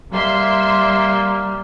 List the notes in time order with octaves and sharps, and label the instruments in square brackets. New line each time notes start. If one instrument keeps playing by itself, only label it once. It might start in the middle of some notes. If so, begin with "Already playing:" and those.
[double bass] G3 [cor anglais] A#3 [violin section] E5 C6